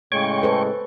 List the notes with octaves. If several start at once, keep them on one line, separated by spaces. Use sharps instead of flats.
A2 C#3 G#3 C#5 G5 C#6
A4 B4 C5